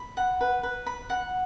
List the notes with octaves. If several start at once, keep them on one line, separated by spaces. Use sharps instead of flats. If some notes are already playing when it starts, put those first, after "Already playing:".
Already playing: B5
F#5
B4
B4
B5
F#5